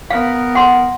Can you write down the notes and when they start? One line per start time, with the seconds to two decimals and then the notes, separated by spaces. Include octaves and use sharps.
0.10 B3 A#4 F5
0.55 F#5 C6